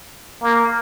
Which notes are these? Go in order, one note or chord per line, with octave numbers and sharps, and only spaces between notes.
A#3